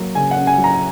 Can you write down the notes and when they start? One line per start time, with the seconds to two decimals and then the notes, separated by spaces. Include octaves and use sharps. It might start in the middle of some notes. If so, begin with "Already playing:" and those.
Already playing: F#3 A#3
0.15 C#3 G#5
0.31 C#4 F#5
0.47 G#5
0.58 F#3
0.64 A#5